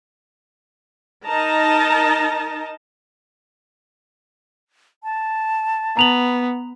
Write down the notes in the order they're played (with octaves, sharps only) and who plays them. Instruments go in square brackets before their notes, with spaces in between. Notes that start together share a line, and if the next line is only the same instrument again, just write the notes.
[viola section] D#4 A#4 D#5 A5 A#5
[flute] A5
[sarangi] B3 [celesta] A#5 F7 F#7